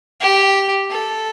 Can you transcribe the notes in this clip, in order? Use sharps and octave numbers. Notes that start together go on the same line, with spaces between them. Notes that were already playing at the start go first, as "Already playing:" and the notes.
G4
A4